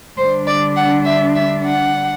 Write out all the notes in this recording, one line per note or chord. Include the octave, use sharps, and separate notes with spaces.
D3 G3 D4 C5
D5
F#5
E5
E5
F#5